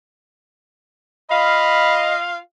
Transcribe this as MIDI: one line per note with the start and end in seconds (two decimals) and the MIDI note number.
1.31 2.38 65
1.31 2.16 75
1.31 2.38 77
1.31 2.03 83